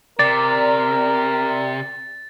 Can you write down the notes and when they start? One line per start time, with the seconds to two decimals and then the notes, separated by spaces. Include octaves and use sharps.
0.19 C3 A#4 D5 A6